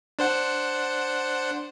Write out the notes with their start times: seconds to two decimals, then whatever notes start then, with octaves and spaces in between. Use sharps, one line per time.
0.19 D4 C5 F#5